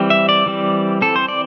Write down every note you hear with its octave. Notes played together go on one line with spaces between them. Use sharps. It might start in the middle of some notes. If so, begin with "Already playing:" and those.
Already playing: E3 G3 C4
E5
D5
E3 G3 C4
E3 C4 A4
C5
D5